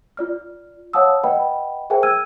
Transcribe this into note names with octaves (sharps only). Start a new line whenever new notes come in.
F4 D5 F6
C#5 F5 F#5 A5 D#6 E6
B4 D#5 F#5 G5 B5
G#4 A#4 C5 E5 G5 G#5
E6 F6 G#6 D#7